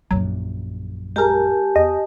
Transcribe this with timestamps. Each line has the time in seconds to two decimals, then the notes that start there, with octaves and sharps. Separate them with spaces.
0.11 A#1 F#2 F#3
1.16 G#3 G4 A#4 G#5 A5
1.76 E2 D#5